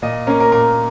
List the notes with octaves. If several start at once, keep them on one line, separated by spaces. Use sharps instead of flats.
A#2 D#5
A#3 C#4 A#4
A#4
A#2 A#4